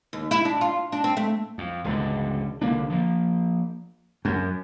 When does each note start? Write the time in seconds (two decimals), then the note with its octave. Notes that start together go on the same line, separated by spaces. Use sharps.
0.13 D#2
0.31 E4
0.45 D4
0.61 F4
0.92 D4
1.04 C4
1.17 A3
1.58 F2
1.84 E1 C#2 G2 D3
2.62 C2 D3 A#3 D4
2.90 F3 A#3
4.25 F#2